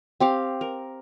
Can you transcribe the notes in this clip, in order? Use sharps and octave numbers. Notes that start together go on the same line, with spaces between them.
C4 G4 F5
A#4